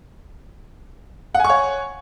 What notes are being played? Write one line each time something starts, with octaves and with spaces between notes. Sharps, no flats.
C#5 F#5 G#5 C#6